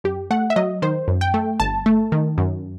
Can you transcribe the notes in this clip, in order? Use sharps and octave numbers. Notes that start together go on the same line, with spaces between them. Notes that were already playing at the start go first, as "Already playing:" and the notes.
F#2 G4
A3 F#5
E5
F#3 D#5
D#3 C5
F#2
G5
A3
G1 A5
A3
D#3
F#2